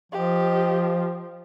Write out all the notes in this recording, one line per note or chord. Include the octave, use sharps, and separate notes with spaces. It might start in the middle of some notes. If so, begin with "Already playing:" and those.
F3 G4 D#5